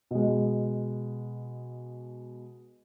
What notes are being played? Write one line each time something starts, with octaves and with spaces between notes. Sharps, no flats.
B2 G#3